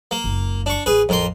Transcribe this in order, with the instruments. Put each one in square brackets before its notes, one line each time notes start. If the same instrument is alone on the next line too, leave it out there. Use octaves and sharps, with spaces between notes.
[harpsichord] A#3
[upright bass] F#1 C#2
[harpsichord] D4 C#6
[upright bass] A1 [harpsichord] G#4 B4
[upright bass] A1 [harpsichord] F2 A#4 C6